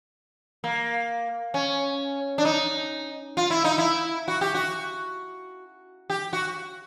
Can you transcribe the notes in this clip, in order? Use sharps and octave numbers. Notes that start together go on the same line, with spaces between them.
A#3
C#4
D4
D#4
F4
E4
D#4
E4
F#4
G4
F#4
G4
F#4